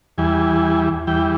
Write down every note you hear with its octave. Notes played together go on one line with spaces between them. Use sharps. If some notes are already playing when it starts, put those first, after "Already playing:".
E2 E3 G3 G#5
E2 E3 G3 G5